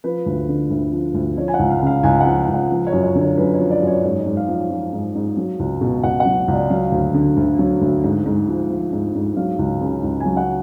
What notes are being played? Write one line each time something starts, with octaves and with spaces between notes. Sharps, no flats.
F3 B4
D2
D3
D2
F3
D2
F3 C#5
G#5
F#5
C#2
F5
C#3 F5
C#2 G#5
F#5
F3
C#2
F#5
F3
C#5
F#2
C#5
D3
C#5
F#2 B4
C#5
F3
D5
F#2
C#5
G#2 C#5
C#5
G#2
F5
F3 F5
F3
G#2
G#2
F#3
C#2
B2
C#2 F#5
F#5
F#3
C#2
D5
F#3 F5
D2
D3
D2
F#3
D2
G#2
G#2
F3
F3
G#2
G#2
F#3 F5
C#2
C#3
C#2
G#5
F#3
F#5